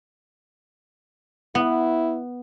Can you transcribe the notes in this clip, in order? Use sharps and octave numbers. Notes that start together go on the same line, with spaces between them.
B3 E4